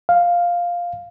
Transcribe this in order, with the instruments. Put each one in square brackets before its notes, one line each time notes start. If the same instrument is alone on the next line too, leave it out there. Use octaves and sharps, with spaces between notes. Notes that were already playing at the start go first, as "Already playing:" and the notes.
[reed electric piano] F5